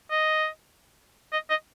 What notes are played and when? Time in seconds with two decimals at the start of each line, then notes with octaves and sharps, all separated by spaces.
0.11 D#5
1.33 D#5
1.50 D#5